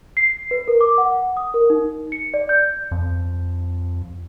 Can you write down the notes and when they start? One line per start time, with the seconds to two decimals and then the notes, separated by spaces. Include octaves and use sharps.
0.17 C7
0.51 B4
0.68 A#4
0.81 D6
0.98 F#5
1.37 D#6
1.54 A#4
1.70 D#4
2.12 C#7
2.34 D5
2.49 G6
2.91 F2